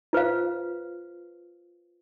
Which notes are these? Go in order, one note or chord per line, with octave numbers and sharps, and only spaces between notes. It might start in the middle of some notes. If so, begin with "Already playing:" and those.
F4 B4 C5 F5